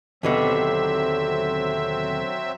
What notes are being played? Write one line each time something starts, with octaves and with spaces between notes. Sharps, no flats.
D#2 B2 D3 F#3 C4 E5